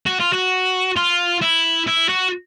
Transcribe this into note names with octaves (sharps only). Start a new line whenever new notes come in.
F#4
F4
F#4
F4
E4
E4
F#4